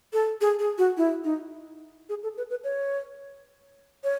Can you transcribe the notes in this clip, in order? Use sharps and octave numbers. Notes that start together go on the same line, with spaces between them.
A4
G#4
G#4
F#4
E4
D#4
G#4
A4
B4
B4
C#5
C#5